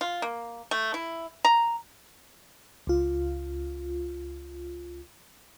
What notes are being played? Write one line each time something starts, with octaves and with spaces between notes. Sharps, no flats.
F4
A#3
A3
E4
A#5
C#2 F4